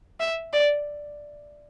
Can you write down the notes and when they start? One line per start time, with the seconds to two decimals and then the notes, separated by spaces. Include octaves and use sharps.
0.20 E5
0.53 D5